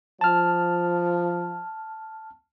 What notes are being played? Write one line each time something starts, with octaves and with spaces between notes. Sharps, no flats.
F3 A5 F6